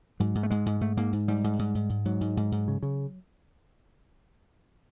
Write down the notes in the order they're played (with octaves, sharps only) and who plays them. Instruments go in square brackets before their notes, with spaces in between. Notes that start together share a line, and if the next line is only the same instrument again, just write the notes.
[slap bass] G#2 F#3
G#2
A3
G#2 G#3
G#2
G#2 A3
G#2 A#3
G#2
G#2 G3
G#2
G#2
G#2
G#2
G#2 F#3
G#2
G#2
G#2
C#3
C#3